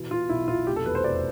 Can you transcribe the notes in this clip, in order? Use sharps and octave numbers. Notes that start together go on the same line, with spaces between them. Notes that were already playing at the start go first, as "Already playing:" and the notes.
Already playing: B2 E3
B2 F4
B1 E4
B1 F4
F1 G4
A4
E2 B4
C5
F1 D5